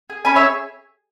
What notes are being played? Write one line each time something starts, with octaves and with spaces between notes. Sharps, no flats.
G#4
C#4 G#5 B5
C#5 E5
G#4